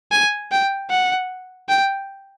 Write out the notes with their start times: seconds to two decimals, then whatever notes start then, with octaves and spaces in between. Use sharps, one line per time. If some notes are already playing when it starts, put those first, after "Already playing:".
0.12 G#5
0.52 G5
0.90 F#5
1.69 G5